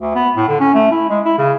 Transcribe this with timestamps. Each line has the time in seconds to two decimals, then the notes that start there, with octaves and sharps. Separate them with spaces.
0.01 D2
0.15 B3
0.36 A2
0.48 D3
0.60 C#4
0.75 A3
0.91 E4
1.10 G#3
1.25 E4
1.38 C#3